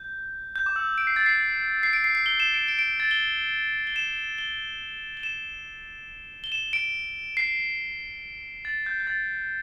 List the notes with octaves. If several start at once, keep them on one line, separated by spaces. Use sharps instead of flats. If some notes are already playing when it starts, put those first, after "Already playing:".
Already playing: G6
G6
D6
E6
D7
C7
A6
C7
C7
D7
C7
C7
G7
E7
D7
D7
D7
A6
G7
G7
E7
G7
G7
E7
G7
E7
D7
C7
A6
G6
G6
A6